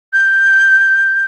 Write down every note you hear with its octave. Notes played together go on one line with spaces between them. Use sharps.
G6